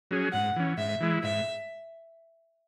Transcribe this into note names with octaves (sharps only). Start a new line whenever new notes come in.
F#3 C#4 G#4
G#2 F#5
E3 C#4
G#2 E5
E3 G#3 E4
G#2 E5